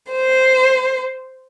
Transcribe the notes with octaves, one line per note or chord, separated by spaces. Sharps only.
C5